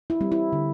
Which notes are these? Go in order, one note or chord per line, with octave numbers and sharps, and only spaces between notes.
E4
G3 C4
E4
D3